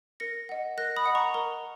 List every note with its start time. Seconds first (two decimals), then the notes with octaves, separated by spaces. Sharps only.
0.20 A#4 A#6 C#7
0.49 D#5 F#5
0.78 A#4 F#6 A#6
0.96 B5 D#6
1.06 D#5 F#5
1.15 A#5 C#6
1.34 A#4 A#5